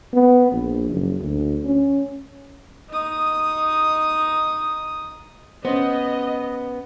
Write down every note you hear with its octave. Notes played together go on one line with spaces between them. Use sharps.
B3
A#1
F#1
D2
C#4
D#4 D#6
B3 C#4 C5 D#5